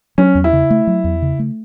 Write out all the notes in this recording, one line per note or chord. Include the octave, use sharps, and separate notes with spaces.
F#3 C#4
E2
E4
C#3
A3
F#3
E2
C#3
A3